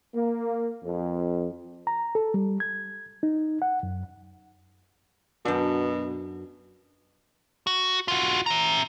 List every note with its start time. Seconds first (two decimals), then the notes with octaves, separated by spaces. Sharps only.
0.13 A#3
0.84 F2
1.87 A#5
2.15 A4
2.34 G3
2.60 G#6
3.23 D#4
3.62 F#5
3.83 F#2
5.45 F#2 B2 D4
7.67 F#4
8.08 F4 F#4
8.46 E5 A#5